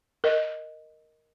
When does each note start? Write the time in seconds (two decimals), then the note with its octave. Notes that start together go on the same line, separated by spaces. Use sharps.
0.24 A#4 D#5